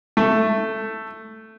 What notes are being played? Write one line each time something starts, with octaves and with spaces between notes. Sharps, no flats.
A3